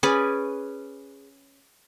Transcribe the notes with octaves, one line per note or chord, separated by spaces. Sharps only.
C#4 G#4 B4 D5